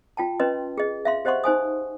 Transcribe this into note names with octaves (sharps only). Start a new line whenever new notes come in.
F4 G5 A5
C#4 B4 D#5 C6
G#4 D#5
E5 F5 C6
G4 C5 D#5 F#5 C6 C#6
D#4 C5 G#5 D#6